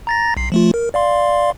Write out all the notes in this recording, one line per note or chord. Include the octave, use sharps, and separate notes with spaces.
A#5 A6 A#6
B1 C7
F3 A3 F4
A#4
D5 F5 C6